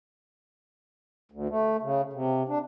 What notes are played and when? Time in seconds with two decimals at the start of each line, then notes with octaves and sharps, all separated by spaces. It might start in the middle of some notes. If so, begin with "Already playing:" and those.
1.32 D2
1.49 A3
1.82 C#3
2.13 C3
2.48 D4